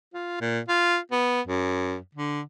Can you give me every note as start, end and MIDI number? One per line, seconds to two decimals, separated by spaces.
0.14 0.37 65
0.41 0.60 46
0.68 0.98 65
1.12 1.41 59
1.47 1.96 42
2.15 2.41 50